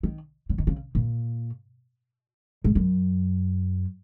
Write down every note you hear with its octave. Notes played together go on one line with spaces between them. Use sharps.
D#3
C#3
D#3
C#3
A#2
G#2
F#2